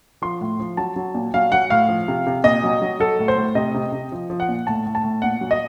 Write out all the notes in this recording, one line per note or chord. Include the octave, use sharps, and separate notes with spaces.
F3 C6
A2
F3
F#3 A5
F#3
A#2
F#3 F5
F#3 F#5
A2 F5
F3
C3
C3
A#2 D#5
F#3
F#3
F#3 A4
A2
C5
A2
C3 D#5
C3
C3
F3
F3
F#5
A#2
A2 A5
A2
A5
A2
A#2 F#5
F#3
D#5